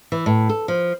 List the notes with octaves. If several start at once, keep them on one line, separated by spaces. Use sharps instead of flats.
E3
A2
A4
F3